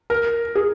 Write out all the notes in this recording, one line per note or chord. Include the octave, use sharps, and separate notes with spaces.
A#4
G#4